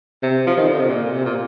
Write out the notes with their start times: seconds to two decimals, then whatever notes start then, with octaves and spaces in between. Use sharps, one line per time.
0.23 C3
0.47 F3
0.57 D#3
0.68 D3
0.79 C3
0.89 A#2
1.11 C3
1.25 A#2